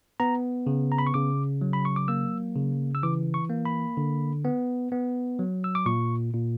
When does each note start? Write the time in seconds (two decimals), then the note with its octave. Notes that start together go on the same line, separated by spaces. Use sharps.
0.20 B3 A#5
0.67 C#3
0.92 A#5
0.98 B5
1.07 C#6
1.14 C#3 D6
1.61 F#3
1.73 B5
1.85 C#6
1.96 D6
2.08 A#3 E6
2.56 C#3
2.95 E6
3.03 E3 D6
3.34 C#6
3.50 A#3
3.65 B5
3.97 D3
4.45 B3
4.92 B3
5.39 F#3
5.64 E6
5.75 D6
5.86 A#2 C#6
6.33 A#2